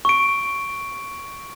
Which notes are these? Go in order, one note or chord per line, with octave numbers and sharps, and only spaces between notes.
C#6 D7